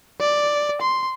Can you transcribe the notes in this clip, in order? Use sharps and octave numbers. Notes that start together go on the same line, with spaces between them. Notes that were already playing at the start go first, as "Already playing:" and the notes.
D5
C6